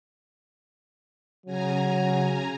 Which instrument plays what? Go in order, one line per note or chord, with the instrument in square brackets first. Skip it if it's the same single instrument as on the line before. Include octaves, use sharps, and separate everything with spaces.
[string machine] C#3 G#5 A#5 [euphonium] F#3